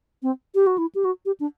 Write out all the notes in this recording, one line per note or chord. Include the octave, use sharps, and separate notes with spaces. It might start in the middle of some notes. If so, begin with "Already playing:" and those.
C4
G4
F#4
E4
G4
F#4
G4
D4